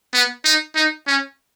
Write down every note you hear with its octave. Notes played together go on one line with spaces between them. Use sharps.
B3
D#4
D#4
C#4